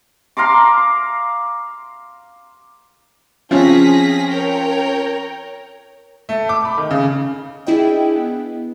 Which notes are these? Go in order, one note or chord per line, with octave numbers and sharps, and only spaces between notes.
F5 A#5 C6 D6
F3 C4 C#4 G#4 A#6 B6
A#4 C#5 G5
A3
D6
B5
D#3
C#3
D4 E4 G#4 D#5 G5
B3